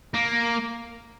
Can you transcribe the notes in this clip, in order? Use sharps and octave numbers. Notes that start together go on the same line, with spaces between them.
A#3